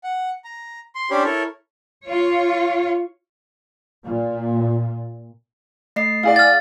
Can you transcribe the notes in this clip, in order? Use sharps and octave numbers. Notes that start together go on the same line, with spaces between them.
F#5
A#5
C6
C#4 D4 G4 C5 C#5 B5
E4 A4 A#4 C#5
F4 C#5
A#2
A3 D#5 C7
C4 E4 G#4 D5 F5
F6 A6